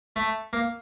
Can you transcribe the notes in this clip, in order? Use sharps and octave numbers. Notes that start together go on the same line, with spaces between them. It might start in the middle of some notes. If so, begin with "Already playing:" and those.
A3
A#3